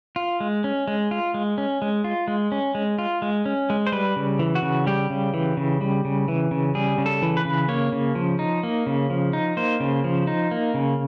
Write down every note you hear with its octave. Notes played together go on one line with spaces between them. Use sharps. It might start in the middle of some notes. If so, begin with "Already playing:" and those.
F4
G#3
C#4
G#3
F4
G#3
C#4
G#3
F4
G#3
C#4
G#3
F4
G#3
C#4
G#3
C5
G3 B4
C#3
E3
F#4
C#3
G3 G4
C#3
E3
C#3
G3
C#3
E3
C#3
G3 G#4
C#3
A4
E3
B4
C#3
A#3 C#5
C#3
F3
D#4
A#3
C#3
F3
D#4
A#3 C5
C#3
F3
D#4
A#3
C#3